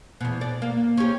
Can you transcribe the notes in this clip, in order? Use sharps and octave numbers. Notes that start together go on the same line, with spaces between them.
E2 B2
D5
A#3
C#4 G4